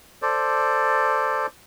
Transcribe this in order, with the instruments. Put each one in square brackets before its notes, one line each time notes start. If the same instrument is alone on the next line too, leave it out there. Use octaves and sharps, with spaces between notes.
[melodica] A4 C5 D5